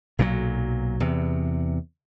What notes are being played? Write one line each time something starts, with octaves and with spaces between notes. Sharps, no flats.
B1 A#2 E3 F#3
E2 C3